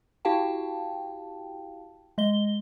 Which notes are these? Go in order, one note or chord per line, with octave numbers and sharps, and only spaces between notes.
E4 F#4 G4 F5 G5 A5
G#3 D#5 G7